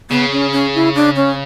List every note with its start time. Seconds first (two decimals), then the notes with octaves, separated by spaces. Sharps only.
0.10 C#3 B3
0.32 C#4
0.52 C#4
0.75 E4
0.95 D4
1.16 C#4